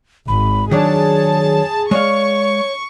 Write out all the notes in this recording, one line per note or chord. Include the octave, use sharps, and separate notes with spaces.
G#1 B5
D#3 F#3 D4 G#4 C#5 A5
G#3 C#5 D5 F5 C#6